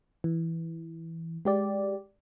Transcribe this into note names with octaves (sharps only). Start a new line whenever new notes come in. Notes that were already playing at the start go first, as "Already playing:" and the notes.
E3
G#3 G4 D5